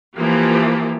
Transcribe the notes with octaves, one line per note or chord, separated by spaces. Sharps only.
E3 F3 A#3 G4